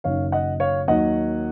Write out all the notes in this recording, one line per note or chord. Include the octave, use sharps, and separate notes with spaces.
F#1 F#2 D#3 C#5 F5
D#5 F#5
C#5 F5
D#2 D#3 F#3 D#5 F#5